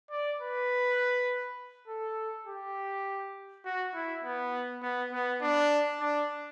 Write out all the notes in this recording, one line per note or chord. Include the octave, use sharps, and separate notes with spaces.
D5
B4
A4
G4
F#4
E4
B3
B3
B3
D4
D4